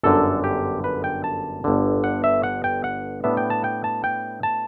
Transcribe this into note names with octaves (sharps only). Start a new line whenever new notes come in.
G1 F#2 D3 A4
G4
B4
G5
A5
G1 G2 D3
F#5
E5
F#5
G5
F#5
A2 G3 B3 D4 E5
G5
A5
G5
A5
G5
A5